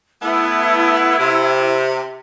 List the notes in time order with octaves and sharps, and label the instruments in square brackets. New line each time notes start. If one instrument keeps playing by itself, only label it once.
[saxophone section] A3 B3 [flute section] E4 E6
[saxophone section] C3